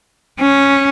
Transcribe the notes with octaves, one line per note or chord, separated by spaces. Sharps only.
C#4